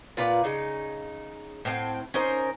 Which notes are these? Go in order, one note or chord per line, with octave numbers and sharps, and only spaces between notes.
A#2 F4 B4 D5
C#3 D#4
A2 C4 F#4 G5
C#4 D#4 A#4 C5